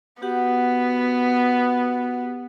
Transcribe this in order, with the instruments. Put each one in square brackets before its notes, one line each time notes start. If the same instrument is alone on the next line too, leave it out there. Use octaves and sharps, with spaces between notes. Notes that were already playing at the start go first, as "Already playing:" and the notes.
[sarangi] B3 [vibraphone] F#4 G4 F#5